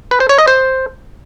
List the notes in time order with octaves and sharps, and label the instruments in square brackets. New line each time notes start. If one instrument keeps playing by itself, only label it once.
[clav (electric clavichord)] B4
C5
C#5
D#5
C5